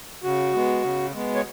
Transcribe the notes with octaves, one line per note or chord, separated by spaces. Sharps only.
C#3 F#4
G#3 B3
C#3
G#3 B3
C#5